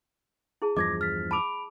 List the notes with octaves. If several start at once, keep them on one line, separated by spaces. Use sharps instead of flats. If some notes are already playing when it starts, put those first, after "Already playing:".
E4 G#4 A5
E2 G2 F3 D#5 D6 G#6 A#6
F6 A6 B6
A5 B5 D6 E6 D7 F7